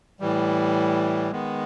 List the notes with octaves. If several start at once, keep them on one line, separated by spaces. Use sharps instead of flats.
A2 E3 G3
D#3 G#3 B3